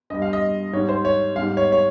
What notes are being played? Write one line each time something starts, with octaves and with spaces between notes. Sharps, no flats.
G2 G3 D#5
F5
D#5
G#2 G3 C#5
C5
C#5
G#2 G3 F5
C#5
C#5